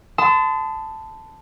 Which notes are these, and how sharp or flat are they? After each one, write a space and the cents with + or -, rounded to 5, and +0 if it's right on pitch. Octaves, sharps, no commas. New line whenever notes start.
A5 +0 C6 -40 D#6 +10